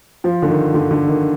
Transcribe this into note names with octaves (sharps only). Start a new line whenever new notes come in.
F3
D3
D#3
D3
D3
D#3